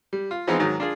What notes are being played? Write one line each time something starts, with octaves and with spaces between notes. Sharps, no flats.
G3
F4
E3 F3 G#3 B3 C4 D#4
G#2 D#3 F#3
D4 F4 G#4